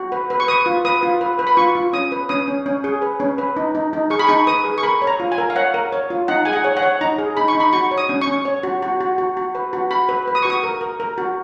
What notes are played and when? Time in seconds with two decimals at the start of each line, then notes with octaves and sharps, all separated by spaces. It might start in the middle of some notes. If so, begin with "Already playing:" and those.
Already playing: F#4
0.12 B4
0.30 B4
0.40 C#6
0.48 B4 D#6
0.66 F4
0.85 B4 D#6
1.03 F4
1.21 B4
1.39 B4
1.47 B5
1.57 F4 C#6
1.75 F4
1.93 C#4 D#6
2.12 B4
2.29 C#4 D#6
2.48 C#4
2.66 C#4
2.84 G#4
3.02 B4
3.20 C#4
3.38 B4
3.56 D#4
3.75 D#4
3.93 D#4
4.10 G#4 C#6
4.19 B5
4.27 D#4 C#6
4.47 B4 D#6
4.65 G#4
4.78 C#6
4.83 A#4 B5
5.02 C#5
5.07 A#5
5.20 F4
5.32 G#5
5.38 A#4
5.50 F5
5.56 C#5 F#5
5.74 A#4
5.92 C#5
6.10 F4
6.28 D#4 F#5
6.45 G#4 G#5
6.53 F#5
6.64 C#5
6.77 F#5
6.82 C#5
7.01 D#4 A#5
7.18 G#4
7.37 D#4 B5
7.48 C#6
7.55 D#4
7.60 B5
7.73 F#4 C#6
7.91 C#5
7.98 D#6
8.09 C#4
8.22 C#6
8.27 C#4
8.45 C#5
8.63 F#4
8.82 F#4
9.00 F#4
9.18 F#4
9.37 F#4
9.55 B4
9.73 F#4
9.91 F#4 B5
10.09 B4
10.28 B4
10.35 D#6
10.42 F#4 C#6
10.50 D#6
10.64 A#4
10.81 A#4
11.00 A#4
11.18 F#4